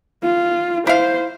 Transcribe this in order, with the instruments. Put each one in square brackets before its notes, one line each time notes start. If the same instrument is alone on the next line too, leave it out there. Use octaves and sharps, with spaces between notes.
[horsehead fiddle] F4
[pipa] E4 F5 [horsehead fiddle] C5